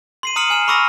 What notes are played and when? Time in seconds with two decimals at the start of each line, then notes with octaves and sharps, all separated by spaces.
0.23 C6 C7 D#7
0.36 A#5 D#6 F6 C#7 D#7 F#7
0.50 G#5 F6 E7
0.68 B5 C#6 D6 E6 F6 A#6